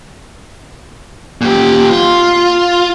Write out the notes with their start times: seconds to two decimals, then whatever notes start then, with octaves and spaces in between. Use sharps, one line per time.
1.41 A#2 G4
1.91 F4